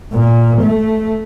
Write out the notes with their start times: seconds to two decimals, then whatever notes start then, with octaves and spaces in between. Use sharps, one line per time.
0.13 A#2
0.62 A3